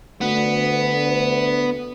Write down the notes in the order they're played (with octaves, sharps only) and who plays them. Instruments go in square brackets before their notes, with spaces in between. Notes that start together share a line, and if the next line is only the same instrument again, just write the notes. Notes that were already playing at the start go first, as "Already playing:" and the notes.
[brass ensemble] D2 [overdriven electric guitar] B3